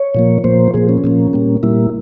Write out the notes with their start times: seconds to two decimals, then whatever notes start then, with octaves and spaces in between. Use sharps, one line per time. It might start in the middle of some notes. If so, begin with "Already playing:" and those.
Already playing: C#5
0.15 A#2 F3 A#3
0.44 A#2 F3 A#3 C5
0.74 A#2 F3 A#3 G#4
0.89 C#4
1.04 A#2 F3 A#3
1.33 A#2 G3 A#3
1.63 A#2 G3 A#3 E4